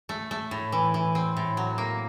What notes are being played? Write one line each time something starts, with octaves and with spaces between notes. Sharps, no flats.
A3
A3
A2
E3
E3
C4
A2
F#3
A#3